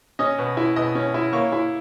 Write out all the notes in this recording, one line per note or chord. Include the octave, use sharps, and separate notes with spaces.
C#4 D#5 D#6
B2
E4
B2 D#5 D#6
C#4
E4
A#3 C#5 C#6
E4